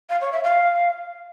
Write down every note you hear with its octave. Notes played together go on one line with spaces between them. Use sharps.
F5
C#5
E5
F5